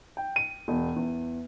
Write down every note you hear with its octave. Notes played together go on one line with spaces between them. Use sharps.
G5
D#7
E1
E2